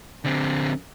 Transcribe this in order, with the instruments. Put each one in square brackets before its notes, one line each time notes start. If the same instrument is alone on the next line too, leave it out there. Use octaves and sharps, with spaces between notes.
[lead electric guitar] D3 C4